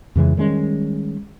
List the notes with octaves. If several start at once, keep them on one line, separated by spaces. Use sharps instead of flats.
F2 C#3 E3 G#3
D#3 G3 G#3 C#4